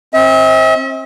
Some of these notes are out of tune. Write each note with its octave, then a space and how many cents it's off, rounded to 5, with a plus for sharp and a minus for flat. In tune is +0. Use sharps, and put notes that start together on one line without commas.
C4 +35 E5 -45